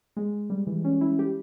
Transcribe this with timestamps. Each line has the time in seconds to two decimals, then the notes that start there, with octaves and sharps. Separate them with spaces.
0.17 G#3
0.50 G3
0.67 E3
0.84 C#4
1.01 E4
1.19 G4